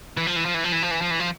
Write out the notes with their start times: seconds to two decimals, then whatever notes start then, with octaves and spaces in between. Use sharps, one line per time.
0.17 E3
0.27 F3
0.36 E3
0.45 F3
0.54 E3
0.64 F3
0.72 E3
0.83 F3
0.91 E3
1.01 F3
1.11 E3
1.19 F3